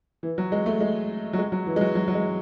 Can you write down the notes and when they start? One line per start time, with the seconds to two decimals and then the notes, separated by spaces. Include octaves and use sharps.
0.23 E3
0.38 F#3
0.52 G#3
0.66 A3
0.81 G#3
1.33 F#3
1.38 G#3
1.52 F#3
1.66 E3
1.76 G#3
1.81 F#3
1.95 F#3
2.08 F#3
2.15 G#3